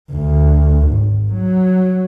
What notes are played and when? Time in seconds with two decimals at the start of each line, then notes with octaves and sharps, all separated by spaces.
0.12 D2
0.88 G#1
1.34 F#3